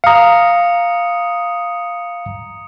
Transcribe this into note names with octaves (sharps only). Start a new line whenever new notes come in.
F5 A#5 D#6 C#7